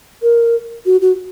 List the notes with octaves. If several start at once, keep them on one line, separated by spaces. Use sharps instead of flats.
A#4
F#4
F#4